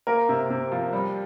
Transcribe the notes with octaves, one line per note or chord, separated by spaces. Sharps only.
A#3 A#4
C3
C3
F3
G3